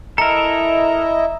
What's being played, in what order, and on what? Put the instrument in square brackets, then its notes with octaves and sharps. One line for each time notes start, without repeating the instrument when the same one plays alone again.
[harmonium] E4 D#5 E5 [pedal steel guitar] A4 A#4 [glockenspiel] A#5